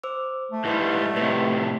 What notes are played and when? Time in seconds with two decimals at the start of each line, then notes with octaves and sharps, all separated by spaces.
0.03 C5 D6 E6
0.52 A3
0.65 G#2 G3 E4 B4 C6
1.16 A2 C3 B4 D#5